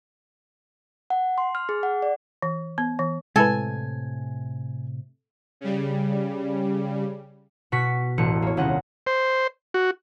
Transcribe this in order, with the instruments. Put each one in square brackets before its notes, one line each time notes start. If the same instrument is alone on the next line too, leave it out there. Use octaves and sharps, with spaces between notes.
[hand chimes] F#5
C6
F6
G#4
F#5
D5
[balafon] E3
B3
E3
[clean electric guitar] A2 C3 [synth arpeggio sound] G#3 E4 B4 [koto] A4 [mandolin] G#5
[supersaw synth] C#3 G3
[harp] B2 F#4 C#6 B6
E1 A1 C#7
A#3 C#5
D#1 C2 C#4 F#5 A#6
[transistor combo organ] C5
F#4